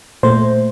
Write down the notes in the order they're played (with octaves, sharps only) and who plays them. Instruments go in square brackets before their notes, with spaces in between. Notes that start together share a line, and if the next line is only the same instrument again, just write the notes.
[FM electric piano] A#2 A3 C5